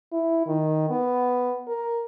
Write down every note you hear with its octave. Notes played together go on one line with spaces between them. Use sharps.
E4
D#3
B3
A#4